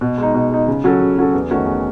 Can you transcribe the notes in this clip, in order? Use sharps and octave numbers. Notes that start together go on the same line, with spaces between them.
B2
G#3 D#4
B2
G#3 D#4
C#3
F#3 C#4 F#4 A4
C#3
F#3 C#4 F#4 A4
E2
D#3 A3 C#4 F#4
E2